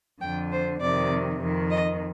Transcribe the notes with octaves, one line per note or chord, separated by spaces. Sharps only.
F2 D3 G5
C5
F2 C3 D#3 D5
F2 D#3
D#5